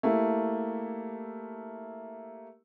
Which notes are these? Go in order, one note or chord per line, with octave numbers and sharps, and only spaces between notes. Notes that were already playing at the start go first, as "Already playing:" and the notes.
A3 A#3 E4 G4